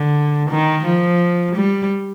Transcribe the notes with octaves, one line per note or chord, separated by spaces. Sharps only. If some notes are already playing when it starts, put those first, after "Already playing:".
Already playing: D3
D#3
F3
G3